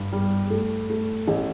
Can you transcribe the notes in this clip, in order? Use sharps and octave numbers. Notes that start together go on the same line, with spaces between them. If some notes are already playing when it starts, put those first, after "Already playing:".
Already playing: G2
G3
A3
A3
A1